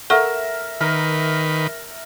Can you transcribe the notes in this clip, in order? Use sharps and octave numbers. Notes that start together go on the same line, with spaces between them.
A4 A#4 E5 F#5 C#6
D#3 A#4 B4